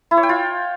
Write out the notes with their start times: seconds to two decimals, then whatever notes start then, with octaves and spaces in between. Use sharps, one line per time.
0.11 E4
0.17 C#5
0.23 G5
0.29 F4